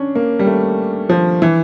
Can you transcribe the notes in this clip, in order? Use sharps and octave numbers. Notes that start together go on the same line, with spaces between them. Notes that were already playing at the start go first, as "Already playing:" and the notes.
Already playing: C#4 D4
A#3
G3
A3
F3
E3